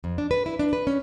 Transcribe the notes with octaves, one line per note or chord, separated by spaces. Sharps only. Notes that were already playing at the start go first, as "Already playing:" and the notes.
F2
D4
B4
E4
D4
B4
C#4